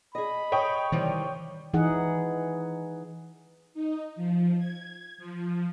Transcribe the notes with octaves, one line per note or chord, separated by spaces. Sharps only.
G#4 D#5 B5
C#5 G5 D#6
C3 D#3 E3 G3
E3 D#4 G#4 F#5
D#4
F3
G#6
F3